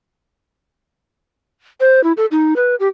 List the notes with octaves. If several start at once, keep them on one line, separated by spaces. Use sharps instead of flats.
C5
E4
A4
D#4
B4
G4